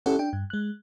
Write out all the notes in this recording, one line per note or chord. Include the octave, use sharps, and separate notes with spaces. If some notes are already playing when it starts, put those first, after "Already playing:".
C#4 E4 G4 A4 C#5 F#5
D4 G5
G2
G#3 F#6